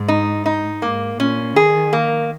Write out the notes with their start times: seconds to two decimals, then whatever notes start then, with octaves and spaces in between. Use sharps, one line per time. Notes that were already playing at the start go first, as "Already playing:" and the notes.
Already playing: G#2
0.08 D#4
0.46 D#4
0.82 G#2 A#3
1.20 A#2 C#4
1.56 D#3 G#4
1.93 A#3